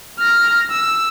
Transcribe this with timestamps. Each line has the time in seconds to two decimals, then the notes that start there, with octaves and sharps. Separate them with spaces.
0.19 F6 A#6
0.70 E6